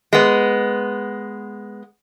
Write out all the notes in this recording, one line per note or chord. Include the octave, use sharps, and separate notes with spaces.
G#3 B3